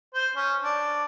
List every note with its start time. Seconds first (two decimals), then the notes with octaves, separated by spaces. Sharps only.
0.14 C5
0.35 C#4
0.63 D4